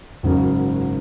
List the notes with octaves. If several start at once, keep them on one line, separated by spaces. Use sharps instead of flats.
G#1 F#2 C#3